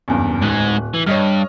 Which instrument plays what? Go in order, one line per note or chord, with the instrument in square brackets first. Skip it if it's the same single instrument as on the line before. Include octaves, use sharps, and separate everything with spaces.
[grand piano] F#1 E2 G2
[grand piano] D1 F#6 [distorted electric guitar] G#2 G#3
[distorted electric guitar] E3
[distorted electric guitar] G2 [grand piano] C#5 D#5 F6